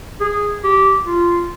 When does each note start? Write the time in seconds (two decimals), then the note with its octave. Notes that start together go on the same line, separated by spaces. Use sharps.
0.21 G#4
0.64 G4
1.06 F4